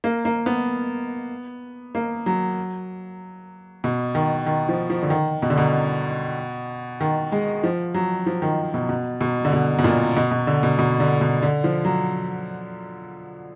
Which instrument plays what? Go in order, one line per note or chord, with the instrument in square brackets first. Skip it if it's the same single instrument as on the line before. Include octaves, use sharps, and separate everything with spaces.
[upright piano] A#3
A#3
B3
A#3
F#3
B2
D#3
D#3
F3
F3
D3
D#3
B2
D3
B2
D#3
G#3
F3
F#3
F3
D#3
B2
B2
B2
D3
B2
B2
A#2
B2
B2
D3
B2
B2
D3
B2
D3
F3
F#3